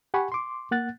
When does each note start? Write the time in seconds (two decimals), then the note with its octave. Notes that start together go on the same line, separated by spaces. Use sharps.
0.14 G4 F#5 G#5 B5 C#6
0.32 C6 D6
0.71 A#3 F#5 F#6 A6